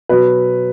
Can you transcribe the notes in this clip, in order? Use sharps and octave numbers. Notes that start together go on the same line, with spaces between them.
B2 F#3 B4